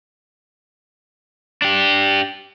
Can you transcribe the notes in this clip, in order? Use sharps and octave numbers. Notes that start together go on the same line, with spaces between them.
D4 G4